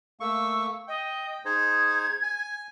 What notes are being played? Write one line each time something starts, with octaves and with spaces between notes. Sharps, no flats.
A3 A#3 C#6 E6
D#5 G5
D#4 G#4 C5 G#6
G#5